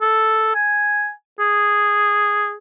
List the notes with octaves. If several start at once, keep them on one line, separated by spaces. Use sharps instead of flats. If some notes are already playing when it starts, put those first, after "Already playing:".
A4
G#5
G#4